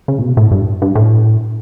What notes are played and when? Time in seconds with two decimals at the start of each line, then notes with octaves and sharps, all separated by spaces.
0.08 C#3
0.18 A2
0.22 B2
0.37 A2
0.51 G2
0.82 G2
0.95 A2